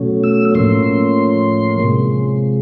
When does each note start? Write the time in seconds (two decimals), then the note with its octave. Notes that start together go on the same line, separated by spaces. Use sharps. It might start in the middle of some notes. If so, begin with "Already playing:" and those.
Already playing: B2 F#3 A3 C#4
0.24 E6
0.55 A2 F3 A#3 C#4 C6
1.79 C3 F3 G#3